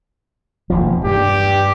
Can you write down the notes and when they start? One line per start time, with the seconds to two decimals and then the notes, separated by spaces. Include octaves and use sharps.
0.70 E1 D#2 F3
1.05 G2 G4